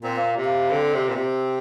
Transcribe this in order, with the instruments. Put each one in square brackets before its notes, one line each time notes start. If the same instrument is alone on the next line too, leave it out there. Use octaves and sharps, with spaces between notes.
[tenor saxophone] A#2 [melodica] C4
[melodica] A#3
[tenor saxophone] C3
[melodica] A#3
[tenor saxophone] D3 [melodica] C4
[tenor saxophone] C3
A#2
C3